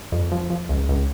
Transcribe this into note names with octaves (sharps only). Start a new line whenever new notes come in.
F2
F3
F3
C#2
C#2